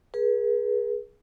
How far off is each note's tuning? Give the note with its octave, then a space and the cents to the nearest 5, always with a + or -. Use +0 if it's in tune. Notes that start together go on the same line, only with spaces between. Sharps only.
G#4 +0 B4 -40